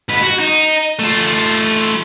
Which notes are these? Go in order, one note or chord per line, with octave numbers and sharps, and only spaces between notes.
G#2 B4
F#4
D#4
A3 F4